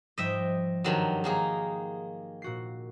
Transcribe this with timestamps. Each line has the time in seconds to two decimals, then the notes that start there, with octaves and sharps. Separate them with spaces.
0.18 G#2 F3 G3 D#5 E5 G5
0.84 G2 D#3 F#3
1.24 D#3 A#3 G#4
2.42 A#2 F#4 C7